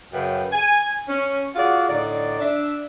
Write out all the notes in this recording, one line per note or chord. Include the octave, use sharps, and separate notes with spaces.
F#2 C#3 B4 G5
G#5
C#4
F4 F#4 G#4 D5 F#5
A2 D3 D#4 D5
D4 E5